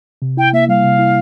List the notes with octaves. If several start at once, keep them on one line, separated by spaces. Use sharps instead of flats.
C3
E4 G5
A#3 E5
G3 F5
C3
E4